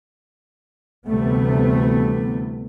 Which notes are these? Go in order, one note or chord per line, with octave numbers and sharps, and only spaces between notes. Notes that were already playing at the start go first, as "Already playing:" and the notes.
D2 C3 E3 G3 A3 B3